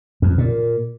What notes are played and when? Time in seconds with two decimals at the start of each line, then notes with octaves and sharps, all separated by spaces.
0.22 F2
0.38 A#2